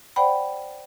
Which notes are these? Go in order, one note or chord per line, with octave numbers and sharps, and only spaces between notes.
C5 D5 F#5 G5 B5